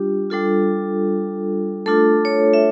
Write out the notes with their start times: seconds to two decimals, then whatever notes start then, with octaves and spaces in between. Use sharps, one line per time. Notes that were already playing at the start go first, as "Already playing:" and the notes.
Already playing: G3 D4 F4 G4
0.30 G3 D4 F4 A4
1.86 A3 D4 F4 A4
2.25 C#5
2.54 E5